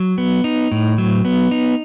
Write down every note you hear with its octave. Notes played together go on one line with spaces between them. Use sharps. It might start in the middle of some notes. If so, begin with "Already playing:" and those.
Already playing: F#3
B3
D#4
A2
F#3
B3
D#4